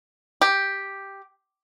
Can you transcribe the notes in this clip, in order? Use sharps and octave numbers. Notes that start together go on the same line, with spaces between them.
G4